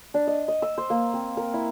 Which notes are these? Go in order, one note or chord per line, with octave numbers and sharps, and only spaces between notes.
D4
D#5
D#5
E6
C5
A#3
C4
A#4
E4